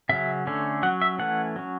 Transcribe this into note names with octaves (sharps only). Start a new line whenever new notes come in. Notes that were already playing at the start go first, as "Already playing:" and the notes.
C#3 F#3 C#4 E5
D3 A3 C#4
F#3 C#4 F#5
E5
E3 A3 C#4 F#5
F#3 C#4